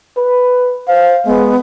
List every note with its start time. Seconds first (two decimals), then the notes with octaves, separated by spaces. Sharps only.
0.17 B4
0.88 C5 F5
1.26 G#3 B3